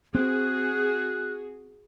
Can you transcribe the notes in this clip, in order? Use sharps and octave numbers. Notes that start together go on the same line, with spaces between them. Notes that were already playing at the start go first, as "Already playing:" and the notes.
C4 F#4 G#4 F#6